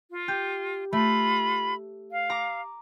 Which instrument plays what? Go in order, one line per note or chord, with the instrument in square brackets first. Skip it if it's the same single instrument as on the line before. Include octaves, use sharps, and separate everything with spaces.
[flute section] F4
[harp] G4
[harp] A3 [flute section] F4 B5
[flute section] F5
[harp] A#5 D6